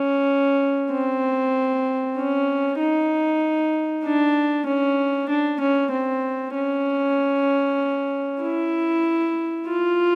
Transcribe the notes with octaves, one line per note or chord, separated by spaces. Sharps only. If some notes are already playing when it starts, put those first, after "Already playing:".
Already playing: C#4
C4
C#4
D#4
D4
C#4
D4
C#4
C4
C#4
E4
F4